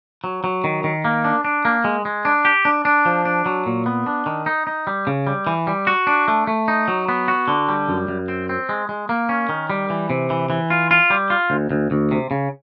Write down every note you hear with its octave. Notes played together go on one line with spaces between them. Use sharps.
F#3
F#3
D#3
D#3
A#3
D4
D4
A#3
G#3
G#3
D4
G4
D4
D4
F3
D4
F#3
A#2
B3
D4
D#3
D#4
D#4
G3
C#3
G3
E3
G3
F#4
D4
A3
A3
D#4
F#3
B3
F#4
D3
G3
F#2
F#2
C4
C4
G#3
G#3
A#3
C#4
D#3
G3
E3
C3
E3
E3
F4
F4
G3
F4
D2
D2
D2
C3
C#3